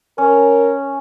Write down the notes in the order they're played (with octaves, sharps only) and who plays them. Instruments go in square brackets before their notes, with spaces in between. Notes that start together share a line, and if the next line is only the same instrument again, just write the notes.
[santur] C#4 [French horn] A#4